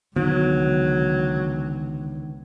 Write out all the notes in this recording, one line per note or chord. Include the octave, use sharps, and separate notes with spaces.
C#2 D3 D#3 F#3 B3